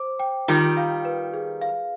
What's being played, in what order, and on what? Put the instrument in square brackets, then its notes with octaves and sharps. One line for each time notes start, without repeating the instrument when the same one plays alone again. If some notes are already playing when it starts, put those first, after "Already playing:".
Already playing: [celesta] C5 D6
G5
[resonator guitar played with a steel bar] D#3 G3 [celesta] F4
[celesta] F5
B4
G#4
F5